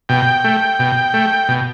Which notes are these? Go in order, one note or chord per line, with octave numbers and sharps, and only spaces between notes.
B2 G5
A3
B2
A3
B2